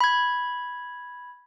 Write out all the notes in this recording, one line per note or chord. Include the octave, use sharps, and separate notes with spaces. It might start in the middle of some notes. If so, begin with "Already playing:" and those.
B5 G#6